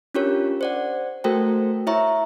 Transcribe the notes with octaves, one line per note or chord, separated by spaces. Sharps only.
C#4 D4 F4 G4 A#4 C#5
C5 D5 F#5
A3 F#4 A4 A#4 C5 G5
E4 C#5 E5 A#5 C#6